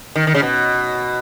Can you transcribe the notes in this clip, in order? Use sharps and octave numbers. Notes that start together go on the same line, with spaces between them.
D#3
D#3
C#3
B2